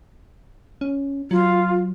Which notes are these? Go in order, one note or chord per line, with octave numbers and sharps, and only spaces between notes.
C#4
F#3 F4